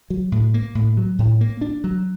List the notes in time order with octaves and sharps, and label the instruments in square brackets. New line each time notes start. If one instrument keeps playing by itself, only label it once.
[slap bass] F#3
A2
A#3
A2
F#3
A2
A#3
D4
F#3